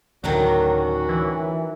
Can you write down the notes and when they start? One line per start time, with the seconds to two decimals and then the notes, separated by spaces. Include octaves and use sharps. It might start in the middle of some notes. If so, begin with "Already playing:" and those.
0.24 D2 A2 D#3 F#3 C#4 D4 F#4
1.09 E3